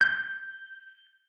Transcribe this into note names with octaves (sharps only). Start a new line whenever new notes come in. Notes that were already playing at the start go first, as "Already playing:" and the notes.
G6